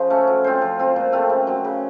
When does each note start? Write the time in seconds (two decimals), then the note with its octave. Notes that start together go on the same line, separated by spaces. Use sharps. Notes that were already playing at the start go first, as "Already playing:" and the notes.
Already playing: C#3 F3 D#4 F4
0.10 A3 C#4 A4
0.27 F#3
0.44 C4 F4 C5
0.62 F3
0.79 C4 F4
0.96 A#2
1.12 A3 C4 F4
1.30 C#3
1.47 F#3 C4
1.64 C#3